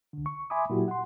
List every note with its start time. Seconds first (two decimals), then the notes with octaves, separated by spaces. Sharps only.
0.13 C2 D3
0.26 C#6
0.50 E5 G#5 B5 C6 D6 D#6
0.70 A#2 F#3 E4 F#4 G4
0.88 F#5 C6